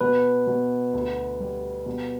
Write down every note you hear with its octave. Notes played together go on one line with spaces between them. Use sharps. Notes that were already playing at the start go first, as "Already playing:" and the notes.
B2 B4
B2
D2
G3
B2